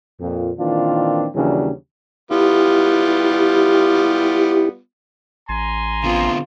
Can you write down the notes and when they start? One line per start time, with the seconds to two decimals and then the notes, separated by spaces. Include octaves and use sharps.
0.20 F2 A#2
0.58 A#2 D#3 E3 C4 D4 F4
1.34 D#2 C#3 E3 F#3 G3 D4
2.31 G3 B3 E4 F4 G4
5.49 A1 G#5 A#5 C6
6.04 D3 B3 C4 F4